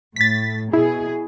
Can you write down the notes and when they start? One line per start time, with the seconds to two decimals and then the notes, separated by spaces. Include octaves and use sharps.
0.16 A2 A6 B6
0.73 B2 E4 G#4